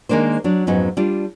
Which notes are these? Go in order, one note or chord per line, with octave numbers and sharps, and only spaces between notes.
D#3 G#3 A#3 D4 C5
F#3 D4
F2 G#2 F#3 G#3 B3 C#4
G3 D4 F4